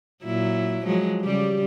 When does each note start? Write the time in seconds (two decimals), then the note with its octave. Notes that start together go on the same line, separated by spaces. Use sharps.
0.24 A#2 F#3 E4
0.84 F3 F#3 G#3
1.22 C#3 G3 G4